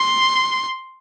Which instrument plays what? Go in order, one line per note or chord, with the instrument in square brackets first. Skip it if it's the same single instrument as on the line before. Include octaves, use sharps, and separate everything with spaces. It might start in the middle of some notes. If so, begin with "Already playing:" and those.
Already playing: [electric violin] C6